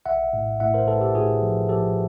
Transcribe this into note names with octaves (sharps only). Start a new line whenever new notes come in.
A#1 E5 F#5
A2
A2 E5 F#5
A#4 C5
A2 A4 B4
G4 A4
A2 F#4 G#4
F3
F3 G4 A4